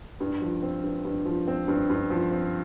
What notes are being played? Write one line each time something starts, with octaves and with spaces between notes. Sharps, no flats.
G2
F3
C4
G2
G2
F3
C4
G2
G2
F3
C4